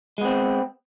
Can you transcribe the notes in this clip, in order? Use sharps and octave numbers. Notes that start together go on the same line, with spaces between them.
G#3 B3 C4